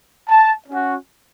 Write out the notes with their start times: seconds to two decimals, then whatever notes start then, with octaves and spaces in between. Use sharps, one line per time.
0.29 A5
0.68 C#4 F#4